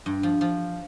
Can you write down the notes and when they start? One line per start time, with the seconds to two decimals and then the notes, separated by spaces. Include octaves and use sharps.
0.06 G2
0.23 F3
0.41 F3